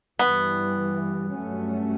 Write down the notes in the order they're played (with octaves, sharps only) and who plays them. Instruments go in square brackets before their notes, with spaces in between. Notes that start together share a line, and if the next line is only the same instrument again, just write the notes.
[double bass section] G2 E3 G3 [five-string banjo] B3
[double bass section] G2 F#3 A3 C#4